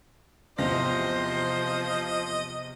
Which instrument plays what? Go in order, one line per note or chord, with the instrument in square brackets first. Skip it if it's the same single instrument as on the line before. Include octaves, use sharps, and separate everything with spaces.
[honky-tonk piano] E2 C3 A#6 [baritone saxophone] F3 [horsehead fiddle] C5 [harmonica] D#5